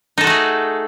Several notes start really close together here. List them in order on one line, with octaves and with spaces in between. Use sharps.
D#4 A4 F#4 A3 G#4